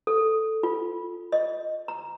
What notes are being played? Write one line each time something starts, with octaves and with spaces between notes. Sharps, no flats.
A4
F4
D#5
A#5